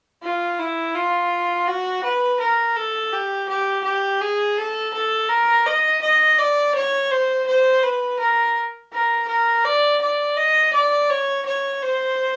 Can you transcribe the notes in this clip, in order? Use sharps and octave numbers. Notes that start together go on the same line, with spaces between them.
F4
E4
F4
F#4
B4
A#4
A4
G4
G4
G4
G#4
A4
A4
A#4
D#5
D#5
D5
C#5
C5
C5
B4
A#4
A#4
A#4
D5
D5
D#5
D5
C#5
C#5
C5